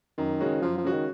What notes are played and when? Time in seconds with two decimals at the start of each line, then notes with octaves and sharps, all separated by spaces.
0.18 F#2 D#3
0.41 C#3 G#3 C#4 F#4
0.62 F#2 F3
0.78 F3
0.84 C#3 G#3 C#4 F#4
0.93 D#3